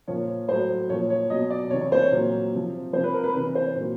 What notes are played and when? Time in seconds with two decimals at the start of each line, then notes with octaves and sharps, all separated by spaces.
0.07 A#2 F3 C#5
0.48 A2 F#3 C5
0.90 A#2 C#5
0.92 F3
1.10 C#5
1.30 B2 F#3 D#5
1.50 D5
1.71 C3 E3 C#5
1.81 C#5
1.92 C5
2.02 C#5
2.12 A#2 F#3
2.53 C3 F3
2.93 F3 C5
2.96 C3
3.04 B4
3.14 A#4
3.24 B4
3.34 C3 E3 B4
3.55 C5
3.76 A#2 F#3